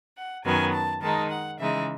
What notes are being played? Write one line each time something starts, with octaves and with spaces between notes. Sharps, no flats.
F#5
F#2 D#3 F#3 B3 G#5
A5
D#3 G#3 D#4 A5
F#5
C#3 E3 G#3 D#4 E5